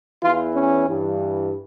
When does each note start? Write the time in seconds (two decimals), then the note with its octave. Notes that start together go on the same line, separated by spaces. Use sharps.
0.22 E2 E3 F4
0.55 C#4
0.88 G2 E3